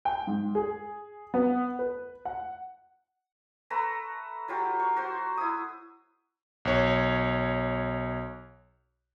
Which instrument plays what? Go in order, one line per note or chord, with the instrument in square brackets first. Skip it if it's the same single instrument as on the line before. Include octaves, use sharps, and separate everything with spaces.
[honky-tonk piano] G5
G#2
G#4
B3
B4
F#5
[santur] A3 B4 A#5
F#3 F4 G4
C#6
F#4 C5
E4 D#6
[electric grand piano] B1 C#5